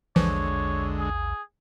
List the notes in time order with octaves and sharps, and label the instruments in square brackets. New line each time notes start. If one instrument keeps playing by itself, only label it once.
[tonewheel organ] A#1 E2 [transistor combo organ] D3 G#3 [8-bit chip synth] E3 F3 [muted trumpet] C#5
[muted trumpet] G#4